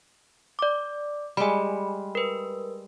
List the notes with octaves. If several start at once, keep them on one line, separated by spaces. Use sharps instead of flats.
D5 D6
G3 G#3 G#5 B5
A#4 B4